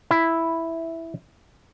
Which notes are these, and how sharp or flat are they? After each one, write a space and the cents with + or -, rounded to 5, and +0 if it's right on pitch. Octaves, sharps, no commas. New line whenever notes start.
E4 +0